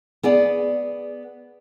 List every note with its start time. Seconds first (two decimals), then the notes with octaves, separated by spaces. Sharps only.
0.23 B3 G#4 D5